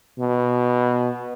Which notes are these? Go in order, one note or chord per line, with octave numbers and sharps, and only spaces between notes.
B2